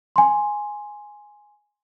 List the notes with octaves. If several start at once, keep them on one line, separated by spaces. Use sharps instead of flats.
G#5 C6